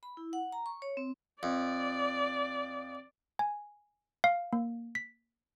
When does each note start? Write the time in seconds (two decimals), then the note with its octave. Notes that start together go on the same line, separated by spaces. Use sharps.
0.03 B5
0.17 E4
0.33 F#5
0.52 A#5
0.66 C#6
0.82 C#5
0.97 C4
1.43 F2 D5
3.39 G#5
4.24 F5
4.53 A#3
4.95 B6